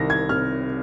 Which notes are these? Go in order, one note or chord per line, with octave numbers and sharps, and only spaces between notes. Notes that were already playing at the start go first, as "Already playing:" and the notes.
Already playing: C2 D#3 A#6
G#6
C3 F6